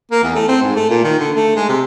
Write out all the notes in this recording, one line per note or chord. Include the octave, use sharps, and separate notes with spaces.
A#3
E2
A3
C4
G#2
A3
A#2
D#3
D3
A3
G#3
C3